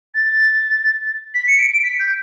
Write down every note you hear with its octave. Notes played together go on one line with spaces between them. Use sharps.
A6
B6
C#7
D7
D7
B6
G6